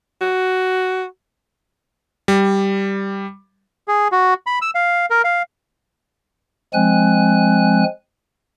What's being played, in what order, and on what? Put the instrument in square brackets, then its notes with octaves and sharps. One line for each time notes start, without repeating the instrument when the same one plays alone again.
[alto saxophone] F#4
[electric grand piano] G3
[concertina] G#4
F#4
B5
E6
F5
A#4
F5
[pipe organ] F3 G#3 C4 G#5 F#6